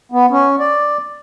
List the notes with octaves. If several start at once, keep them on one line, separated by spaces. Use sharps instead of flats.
B3
C#4
D5